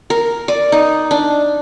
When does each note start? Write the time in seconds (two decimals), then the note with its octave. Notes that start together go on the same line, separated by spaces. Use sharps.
0.10 A#4
0.48 D5
0.72 D#4
1.11 D4